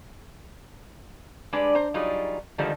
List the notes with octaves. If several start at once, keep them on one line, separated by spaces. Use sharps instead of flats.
G3 G#3 D4 B4 D5
C5 A#5
F#3 G3 D#4 F4 G#4
D3 D#3 F3 G3 G#3 D#4